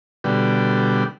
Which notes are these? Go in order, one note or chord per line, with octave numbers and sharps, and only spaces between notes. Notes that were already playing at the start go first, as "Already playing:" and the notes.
B2 D3 G3